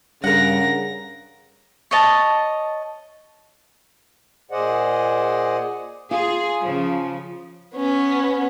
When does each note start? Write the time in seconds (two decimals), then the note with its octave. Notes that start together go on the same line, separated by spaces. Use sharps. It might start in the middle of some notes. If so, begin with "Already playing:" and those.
0.24 G2 C#3 A#4 F#5 A#6
1.91 C#5 D#5 A5
4.51 A#2 G#4 C5 D5 D#5 F#5
6.11 F4 G#4
6.64 C#3 F3
7.75 B3 C#4